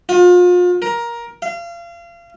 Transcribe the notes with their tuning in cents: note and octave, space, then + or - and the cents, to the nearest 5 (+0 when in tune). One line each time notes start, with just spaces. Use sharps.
F4 +35
A#4 +15
F5 -35